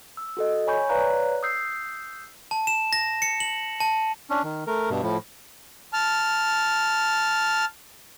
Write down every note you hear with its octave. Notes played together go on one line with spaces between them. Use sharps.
E6
F#4 A4 D#5
C#5 G#5 B5 C#6 G6
B4 C#5 D5 F5 A#5 F#6
D#6 E6 G6 C7
A5
E7
A#6
C#7
F#7
A5
C#4 D4
D#3
A3 A#4
G2 B2
A2 F3
A5 F6